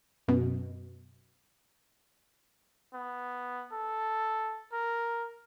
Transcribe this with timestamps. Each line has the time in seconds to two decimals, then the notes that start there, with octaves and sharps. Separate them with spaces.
0.28 F#2 B2
2.94 B3
3.72 A4
4.73 A#4